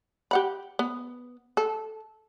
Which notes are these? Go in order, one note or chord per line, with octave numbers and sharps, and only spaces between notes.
G4 F#5 B5
B3
A4